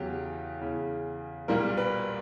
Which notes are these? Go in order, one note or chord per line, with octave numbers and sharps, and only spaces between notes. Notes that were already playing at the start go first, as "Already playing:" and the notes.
Already playing: E2 C#3 F#3 G4
E2 C#3 E3
B1 A#2 G3 A#3 A#4
B4